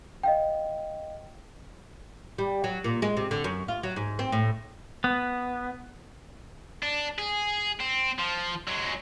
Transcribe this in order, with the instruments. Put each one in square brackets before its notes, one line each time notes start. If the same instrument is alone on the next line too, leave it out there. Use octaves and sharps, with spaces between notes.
[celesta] D#5 F5 G5
[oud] G3
F#3
A#2
G#3
C3
D3
F#2
F4
F#3
G#2
C4
A2
[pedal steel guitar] B3
[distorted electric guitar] D4
G#4
C4
F3
F#3 G#3